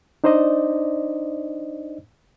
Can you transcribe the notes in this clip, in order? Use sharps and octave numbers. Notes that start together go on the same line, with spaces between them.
D4 D#4 C5 D5 D#5